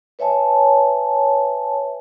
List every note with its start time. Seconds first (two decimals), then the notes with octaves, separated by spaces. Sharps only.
0.19 B4 C#5 E5 G#5 A5